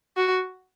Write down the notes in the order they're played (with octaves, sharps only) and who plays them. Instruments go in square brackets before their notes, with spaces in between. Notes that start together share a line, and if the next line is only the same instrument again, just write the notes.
[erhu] F#4